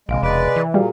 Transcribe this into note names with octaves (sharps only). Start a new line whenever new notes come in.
A#1 C3 G#3 F5 D7
E1 G#3 B4 D5
E3
A#2 G3 F#4 G#4 F5